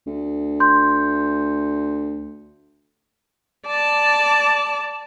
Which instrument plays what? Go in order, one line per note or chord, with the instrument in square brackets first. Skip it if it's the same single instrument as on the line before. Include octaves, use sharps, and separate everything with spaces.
[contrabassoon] D2
[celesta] C6 G6
[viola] D5 A5